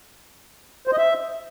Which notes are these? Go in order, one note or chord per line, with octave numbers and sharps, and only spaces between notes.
C5
D#5
E5